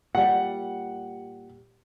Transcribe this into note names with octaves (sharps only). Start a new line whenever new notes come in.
A#2 G3 F#5